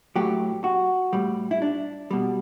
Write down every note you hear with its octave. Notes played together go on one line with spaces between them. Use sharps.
A2 F#3 G4
F#4
A2 G3
E4
D4
B2 G3